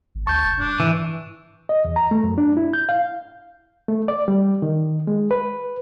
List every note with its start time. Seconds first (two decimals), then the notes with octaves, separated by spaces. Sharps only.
0.15 G#1
0.27 D2 A5 C#6 G6
0.45 F1
0.59 G2 D4
0.80 G#2 E3
1.69 D#5
1.85 E2
1.96 A#5
2.11 A3
2.24 F#2
2.38 D4
2.57 E4
2.73 G6
2.89 F5
3.88 A3
4.08 D5
4.28 G3
4.62 D#3
5.07 G#3
5.31 B4